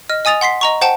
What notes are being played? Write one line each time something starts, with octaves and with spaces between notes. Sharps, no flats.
D#5 F6
D#5 G#5 D#6 A6 F7
F#5 C6 B6 C7
D#5 A#5 C#6
C5 F#5 G5 A5